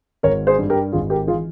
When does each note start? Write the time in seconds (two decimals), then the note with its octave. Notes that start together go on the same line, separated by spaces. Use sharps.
0.23 G#1 A#4 C#5
0.47 G#4 C5
0.58 G2
0.70 G4 A#4
0.92 G#1 F4 G#4
1.10 G4 A#4
1.27 E3 F4 G#4